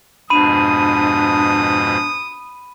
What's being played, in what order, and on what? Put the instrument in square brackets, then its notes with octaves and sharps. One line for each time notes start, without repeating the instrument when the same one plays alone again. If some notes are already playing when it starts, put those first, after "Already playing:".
[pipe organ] F2 G#2 B2 [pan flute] D4 [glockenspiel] B5 D#7 [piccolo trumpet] D#6